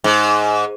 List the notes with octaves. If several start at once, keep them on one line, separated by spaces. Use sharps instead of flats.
G#2